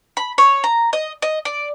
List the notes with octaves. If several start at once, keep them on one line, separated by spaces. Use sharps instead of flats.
B5
C#5
A#5
D#5
D#5
D5